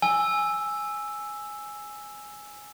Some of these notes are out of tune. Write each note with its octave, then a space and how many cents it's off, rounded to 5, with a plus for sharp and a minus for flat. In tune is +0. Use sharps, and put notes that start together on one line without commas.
G#5 +0 E6 +0